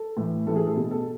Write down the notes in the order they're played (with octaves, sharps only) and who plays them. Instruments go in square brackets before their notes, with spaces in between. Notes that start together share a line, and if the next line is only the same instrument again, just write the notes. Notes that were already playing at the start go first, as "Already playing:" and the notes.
Already playing: [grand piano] A4
A2 E3
A2 E3 A4
G#4
A4
B2 G#4
A4